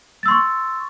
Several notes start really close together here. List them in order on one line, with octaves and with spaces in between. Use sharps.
A6 E6 C6 C#6